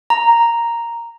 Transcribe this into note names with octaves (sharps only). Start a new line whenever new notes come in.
A#5